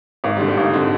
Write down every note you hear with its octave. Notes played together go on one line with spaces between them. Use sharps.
G#1 A#3
G3
D3
G3
G#1 D#4
D3 C4